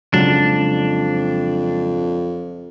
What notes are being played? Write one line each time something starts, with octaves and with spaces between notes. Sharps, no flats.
F2 C#3 F#3 G#3 D4